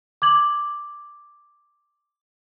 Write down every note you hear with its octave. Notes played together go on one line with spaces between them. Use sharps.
D6 G#6 F#7